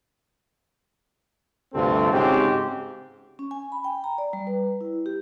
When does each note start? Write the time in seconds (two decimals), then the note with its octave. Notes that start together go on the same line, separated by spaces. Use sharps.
1.74 D2 G2 C3 C4 F4 A4
2.12 G#2 C#3 C4 F#4 G4
3.39 C#4
3.51 G#5
3.72 B5
3.84 G5
4.04 A#5
4.18 D5
4.33 G3
4.47 B4
4.81 E4
5.06 G4